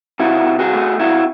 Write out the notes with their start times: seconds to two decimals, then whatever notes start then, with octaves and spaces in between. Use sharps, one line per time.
0.19 C3 E4 F#4
0.46 C3
0.59 F#4 G#4
0.73 A3
0.99 C3 E4 F#4